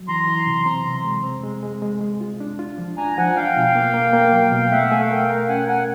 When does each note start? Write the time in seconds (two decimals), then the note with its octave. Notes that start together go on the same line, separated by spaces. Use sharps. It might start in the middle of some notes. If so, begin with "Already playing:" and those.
Already playing: F#3
0.08 E3 A#5 C6
0.27 E3
0.47 C3
0.65 C4 A#5 C6
0.85 C3
1.04 G#3
1.23 C4
1.43 G#3
1.63 G#3
1.82 G#3
2.01 G#3
2.21 F4
2.40 D4
2.59 F4
2.78 F3
2.97 D4 G#5 A#5
3.17 F3 F#5 G#5
3.36 D4 F5 G5
3.56 B2
3.75 A#3
3.94 A#3
4.13 A#3
4.32 F#3
4.52 B2
4.71 A3 E5 F#5
4.91 A3 G#5
5.00 F5 G5
5.11 A#4
5.30 A#4
5.48 C#4 F#5 G#5
5.68 A#4 F#5 G#5